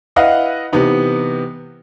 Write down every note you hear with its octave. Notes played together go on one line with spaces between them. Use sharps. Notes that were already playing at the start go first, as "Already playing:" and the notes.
E4 B4 D#5 F5 F#5
C3 E3 B3 D#4